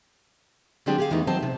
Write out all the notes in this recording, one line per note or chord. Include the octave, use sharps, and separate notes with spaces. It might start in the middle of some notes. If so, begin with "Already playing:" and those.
D3 F#3 C4 D4 G4 G#4
G4 G#4 F5
E2 E3 A3 B3 D#4
D#3 F#3 C4 C5 A5
C3